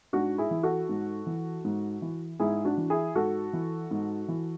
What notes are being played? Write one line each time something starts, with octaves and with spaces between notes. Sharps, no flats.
G#2 D4 F#4
E4 G#4
E3
F#4 A4
G#2
E3
G#2
E3
G#2 E4 G#4
D4 F#4
E3
E4 G#4
G#2 F#4 A4
E3
G#2
E3